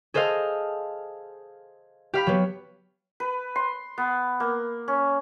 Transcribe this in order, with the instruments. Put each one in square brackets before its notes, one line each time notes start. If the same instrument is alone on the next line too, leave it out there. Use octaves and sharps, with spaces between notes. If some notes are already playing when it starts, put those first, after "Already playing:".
[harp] G#4 A4 C5 D#5 F5
G4 F5 B5
F#3 B3
[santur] B4
C6
B3
A#3
C#4